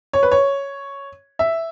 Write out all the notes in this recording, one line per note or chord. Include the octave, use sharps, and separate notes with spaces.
C#5
B4
C#5
E5